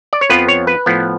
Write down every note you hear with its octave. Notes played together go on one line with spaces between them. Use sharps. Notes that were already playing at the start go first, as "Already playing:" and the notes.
D5
C#5
F2 F3 B3 F4 B4
C#5
B4
A2 F3 B3